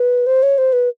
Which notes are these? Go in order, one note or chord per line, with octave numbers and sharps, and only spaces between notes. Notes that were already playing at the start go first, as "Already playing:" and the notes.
Already playing: B4
C5
C#5
C5
B4